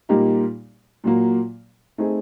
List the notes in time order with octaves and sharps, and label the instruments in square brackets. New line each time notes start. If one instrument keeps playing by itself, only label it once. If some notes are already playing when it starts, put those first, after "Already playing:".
[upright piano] A#2 G3 A#3 D#4 G4
A#2 F#3 A#3
A3 C4 D#4 G#4